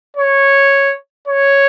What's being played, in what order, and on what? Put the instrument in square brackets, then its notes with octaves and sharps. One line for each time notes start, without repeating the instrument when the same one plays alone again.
[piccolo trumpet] C#5
C#5